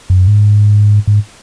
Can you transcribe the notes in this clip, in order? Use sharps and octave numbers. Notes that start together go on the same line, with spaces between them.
F#2
G#2
G#2